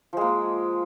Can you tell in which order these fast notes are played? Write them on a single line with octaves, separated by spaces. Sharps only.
F3 G#3 A#3